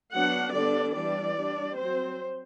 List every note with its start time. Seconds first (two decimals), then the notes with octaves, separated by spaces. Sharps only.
0.14 F#3 B3 D4 F#5
0.54 D3 G3 B3 D4 D5
0.95 E3 G3 D4 D5
1.36 G3 D4
1.77 F#3 C4 C5